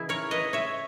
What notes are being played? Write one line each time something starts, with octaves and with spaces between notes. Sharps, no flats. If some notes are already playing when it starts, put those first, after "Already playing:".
Already playing: C#3 E3 D#4 E4 G#4
A#4 C#5
B4 D#5
C#5 E5